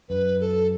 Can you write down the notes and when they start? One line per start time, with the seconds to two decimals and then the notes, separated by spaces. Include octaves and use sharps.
0.09 F#2 B4
0.40 A4